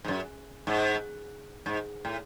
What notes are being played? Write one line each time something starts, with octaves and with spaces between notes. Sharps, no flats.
G#2
F#2
G#2
G#2
A2